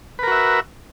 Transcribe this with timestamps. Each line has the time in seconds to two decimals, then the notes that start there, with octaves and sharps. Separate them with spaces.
0.19 B4
0.23 A#4
0.27 F#4
0.32 E5